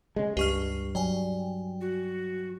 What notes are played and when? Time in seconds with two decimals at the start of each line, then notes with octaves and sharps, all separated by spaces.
0.16 C#3 G#3
0.37 C#2 G2 G4 C#6 F6
0.95 F#3 D5 G5 G#5
1.80 F#4